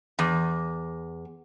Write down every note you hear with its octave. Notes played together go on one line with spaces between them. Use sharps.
E2